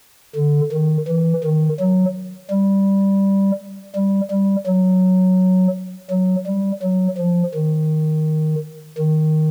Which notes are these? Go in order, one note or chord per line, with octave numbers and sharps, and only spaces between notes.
D3
D#3
E3
D#3
F#3
G3
G3
G3
F#3
F#3
G3
F#3
F3
D#3
D#3